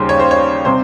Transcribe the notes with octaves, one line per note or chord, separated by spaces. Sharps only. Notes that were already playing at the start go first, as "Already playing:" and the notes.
Already playing: D#2 C#3 G3 C5
C#5
C5
C#5
C3 G3 C4 C5